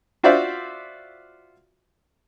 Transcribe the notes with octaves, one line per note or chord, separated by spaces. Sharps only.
F4 F#4 C5 D5 E5 F5